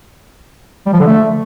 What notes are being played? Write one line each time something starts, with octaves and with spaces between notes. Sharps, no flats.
G3
F3
D3
A3